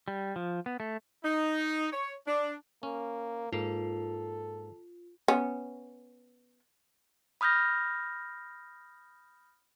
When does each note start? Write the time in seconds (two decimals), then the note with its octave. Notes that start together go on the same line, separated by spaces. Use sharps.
0.08 G3
0.36 F3
0.66 B3
0.80 A3
1.24 D#4
1.92 C#5
2.27 D4
2.83 A#3 C#4
3.53 G#2 A#3 F4 A4
5.28 B3 C#4
7.41 B5 D#6 F6 G6 A#6